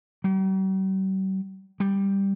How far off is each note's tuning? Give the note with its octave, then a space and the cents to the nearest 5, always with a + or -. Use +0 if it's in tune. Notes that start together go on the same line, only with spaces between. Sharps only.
G3 -45
G3 +5